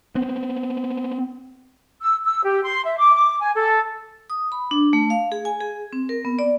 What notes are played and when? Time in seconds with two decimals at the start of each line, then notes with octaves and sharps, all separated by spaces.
0.15 B3 C4
2.01 E6
2.24 E6
2.44 G4
2.64 C6
2.84 E5
2.98 D6
3.15 D6
3.41 G#5
3.54 A4
4.30 D#6
4.52 B5
4.71 D4
4.93 A3
5.10 F5
5.32 G#4
5.45 G#5
5.60 G#4
5.93 C4
6.09 A#4
6.25 B3
6.39 D5